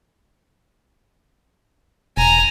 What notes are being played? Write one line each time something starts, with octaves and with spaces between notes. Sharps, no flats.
E1 G#5 A#5